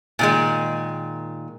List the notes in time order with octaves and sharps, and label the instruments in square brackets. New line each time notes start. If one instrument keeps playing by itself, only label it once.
[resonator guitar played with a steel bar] A#2 D#3 G#3